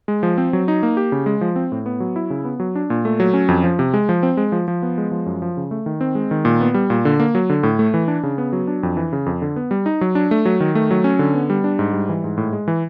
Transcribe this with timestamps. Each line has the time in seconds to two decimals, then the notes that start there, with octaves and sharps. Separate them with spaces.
0.08 G#3
0.23 F3
0.38 C4
0.53 F#3
0.68 D#4
0.83 A#3
0.97 G4
1.12 C#3
1.26 G#3
1.41 F3
1.56 C4
1.72 A2
1.86 B3
2.00 F#3
2.16 E4
2.30 C#3
2.45 B3
2.60 F#3
2.75 D4
2.90 A#2
3.05 A3
3.20 F#3
3.34 C#4
3.48 F2
3.64 F3
3.79 C3
3.94 G#3
4.09 F3
4.23 C4
4.37 G#3
4.52 F3
4.68 F3
4.82 B3
4.98 G#3
5.11 F3
5.26 F#2
5.42 F3
5.57 C#3
5.71 A3
5.86 D#3
6.01 C4
6.15 G#3
6.31 D#3
6.45 A#2
6.61 B3
6.74 G3
6.90 A#2
7.05 D3
7.20 A#3
7.35 F#3
7.50 D3
7.63 A2
7.79 A3
7.94 E3
8.08 D4
8.23 C#3
8.38 B3
8.53 F#3
8.67 D4
8.83 F2
8.97 E3
9.13 C#3
9.26 F2
9.42 D3
9.56 B3
9.71 G3
9.86 D#4
10.01 F#3
10.15 D4
10.31 A3
10.45 F#3
10.60 D#3
10.75 A3
10.91 F#3
11.04 C#4
11.19 D3
11.34 B3
11.50 G3
11.64 D4
11.79 G#2
11.93 G3
12.09 E3
12.24 G#2
12.38 A2
12.53 G#3
12.68 E3